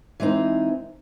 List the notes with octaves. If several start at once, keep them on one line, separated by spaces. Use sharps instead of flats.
E3 G#3 C4 D#4